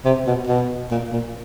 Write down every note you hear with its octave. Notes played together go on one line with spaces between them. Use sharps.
C3
B2
B2
A#2
A#2